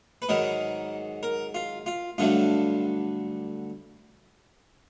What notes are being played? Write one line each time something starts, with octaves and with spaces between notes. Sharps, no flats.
B4
G#2 D#3 F#3 A#4
A#4
F4
F4
G2 D3 F#3 A3 F4